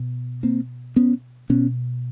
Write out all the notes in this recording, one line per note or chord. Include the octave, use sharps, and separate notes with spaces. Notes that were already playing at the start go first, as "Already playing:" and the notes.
Already playing: B2
A#3 C4
B3 C#4
B2 B3 C#4